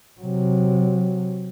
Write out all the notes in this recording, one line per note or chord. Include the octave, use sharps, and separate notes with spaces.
C3 F#3